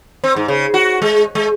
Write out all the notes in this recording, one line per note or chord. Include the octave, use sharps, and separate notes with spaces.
C4
G#2
C#3
F#4
G#3
G#3